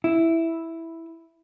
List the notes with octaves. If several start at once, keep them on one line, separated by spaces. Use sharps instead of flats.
E4